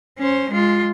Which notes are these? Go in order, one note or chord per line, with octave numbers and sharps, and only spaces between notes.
C#4 C5
G#3 F4